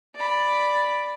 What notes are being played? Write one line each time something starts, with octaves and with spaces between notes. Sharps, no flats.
D5 B5